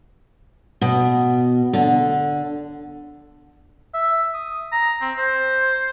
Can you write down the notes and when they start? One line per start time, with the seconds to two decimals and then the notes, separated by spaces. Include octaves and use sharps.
0.81 B2
1.73 D3
3.94 E5
4.34 D#6
4.72 A#5
5.02 C4
5.18 C5